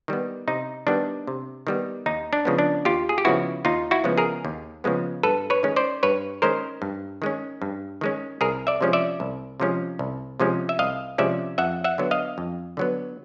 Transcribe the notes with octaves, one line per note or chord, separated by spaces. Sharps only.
D#3 G3 B3
C3 D#4
D#3 G3 B3 D4
C3
D#3 G3 B3
D#2 D#4
D4
C#3 F3 G#3 B3
D4
D#2 F4 G4
G#4
G4
C#3 F3 G#3 B3 E4 F#4
D#2 D#4 F4
E4 F#4
C#3 F3 G#3 B3
G#4 A#4
D#2
C#3 F3 G#3 B3
G2 A4 B4
B4 C#5
D#3 G#3 C#4
C5 D5
G2 B4 C#5
D#3 G#3 C#4 A#4 C5
G2
D#3 G#3 C#4
G2
D#3 G#3 C#4
C2 G#4 A#4
D5 E5
C3 F3 G#3 C#4
D5 E5
C2
C3 F3 G#3 C#4
C2
C3 F3 G#3 C#4
E5
C2 D#5 F5
C3 F3 G#3 C#4 D5 E5
F2 E5 F#5
E5 F#5
D3 F#3 B3
D#5 F5
F2
D3 F#3 B3